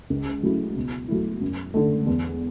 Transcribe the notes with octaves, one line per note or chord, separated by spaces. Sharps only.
C#2
C#3 F#3 A3 E4
B2
F#3 A3 E4
F#2
D3 A3
E2